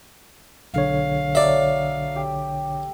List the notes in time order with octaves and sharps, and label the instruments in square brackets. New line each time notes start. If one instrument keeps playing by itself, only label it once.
[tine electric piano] B1 D3 C#5 [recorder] F5
[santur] F#3 A4 [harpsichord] D5 E5
[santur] G4